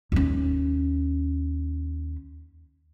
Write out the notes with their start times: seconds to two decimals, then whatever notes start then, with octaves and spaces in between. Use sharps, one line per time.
0.12 D#2 C#4